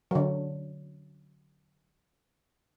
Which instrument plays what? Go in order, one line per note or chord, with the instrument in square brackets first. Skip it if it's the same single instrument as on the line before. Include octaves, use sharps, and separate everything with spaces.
[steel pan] D3 F#3